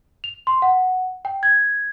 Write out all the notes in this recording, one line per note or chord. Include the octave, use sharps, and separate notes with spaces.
F7
C6
F#5
G5
G#6